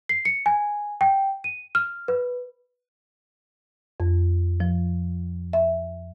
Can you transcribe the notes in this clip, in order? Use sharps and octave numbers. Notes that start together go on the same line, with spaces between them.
C7
C#7
G#5
G5
D#7
F6
B4
F2
F3
E5